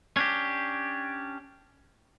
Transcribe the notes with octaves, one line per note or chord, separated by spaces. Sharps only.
C#4 D4 G4